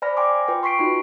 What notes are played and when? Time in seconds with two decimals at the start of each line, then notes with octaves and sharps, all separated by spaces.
0.02 C5 D5 G#5 B5 F6 A#6
0.17 G5 G#5 C6 D6
0.48 F4 B4 G5
0.63 C6 C#6 B6 C7 D7
0.79 D#4 F4 F#4 B5